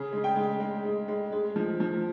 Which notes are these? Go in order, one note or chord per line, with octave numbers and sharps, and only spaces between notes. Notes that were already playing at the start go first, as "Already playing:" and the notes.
Already playing: C#3 G#4
G#3
G5
G#3
G#3
G#3
G#3
G#3
F3
F3